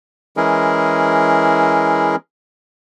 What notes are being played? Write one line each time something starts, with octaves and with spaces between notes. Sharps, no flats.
E3 G#3 C#4 E4 G#4 A#4